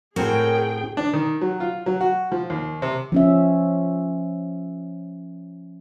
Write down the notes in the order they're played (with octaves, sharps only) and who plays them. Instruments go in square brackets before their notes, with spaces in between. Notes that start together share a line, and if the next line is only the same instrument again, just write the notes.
[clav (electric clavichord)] A2 C4 F#4 [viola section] G#4 G5 [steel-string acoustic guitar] A#4 C#5
[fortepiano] D4
D#3
F#3
F4
F#3
F#4
F3
D#2
C3
[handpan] F3 C#4 E5